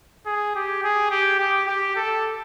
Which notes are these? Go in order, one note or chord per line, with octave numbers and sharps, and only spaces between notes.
G#4
G4
G#4
G4
G4
G4
A4